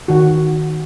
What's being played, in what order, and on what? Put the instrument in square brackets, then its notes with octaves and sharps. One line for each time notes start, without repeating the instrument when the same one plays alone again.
[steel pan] D#3 F#4